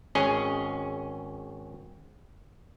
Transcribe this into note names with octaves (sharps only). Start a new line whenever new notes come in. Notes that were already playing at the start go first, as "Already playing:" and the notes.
G#1 C#4 G#4 D#5